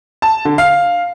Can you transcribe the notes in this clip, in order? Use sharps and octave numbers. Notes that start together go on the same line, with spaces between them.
A5
D3
F5